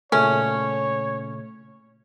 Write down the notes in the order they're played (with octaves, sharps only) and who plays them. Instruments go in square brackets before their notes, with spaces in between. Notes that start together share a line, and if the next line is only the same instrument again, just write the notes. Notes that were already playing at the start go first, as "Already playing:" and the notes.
[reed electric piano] A#2 C#3 A3 [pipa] C#4 [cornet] C#5